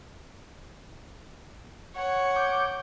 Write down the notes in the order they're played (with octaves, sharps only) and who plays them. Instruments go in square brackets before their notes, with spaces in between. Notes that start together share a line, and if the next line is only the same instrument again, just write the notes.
[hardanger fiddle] C#5 F#5
[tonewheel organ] D6 G6